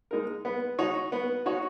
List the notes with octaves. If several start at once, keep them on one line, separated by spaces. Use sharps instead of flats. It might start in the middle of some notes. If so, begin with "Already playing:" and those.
G#3 D#4 A#4
B3
D#4 F#4 C#5
B3
D#4 F#4 C#5